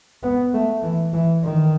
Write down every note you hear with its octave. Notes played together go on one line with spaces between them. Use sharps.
B3
A3
E3
E3
D#3